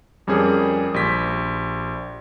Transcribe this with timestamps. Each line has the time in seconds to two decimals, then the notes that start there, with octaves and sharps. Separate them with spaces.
0.27 F2 G3 C#4 G#4 A#4
0.94 A#1 G4 B6